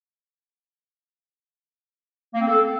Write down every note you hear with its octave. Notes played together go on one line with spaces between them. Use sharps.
A#3
C4
A4